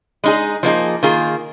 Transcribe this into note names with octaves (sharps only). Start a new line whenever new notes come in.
G#3 D#4 G#4
F3 A#3 D#4 G#4
D#3 A#3 F4 G#4